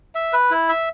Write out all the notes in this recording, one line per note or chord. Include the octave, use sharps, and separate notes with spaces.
E5
B4
E4
E5